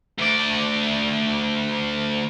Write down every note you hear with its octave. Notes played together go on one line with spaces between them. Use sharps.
D2 D5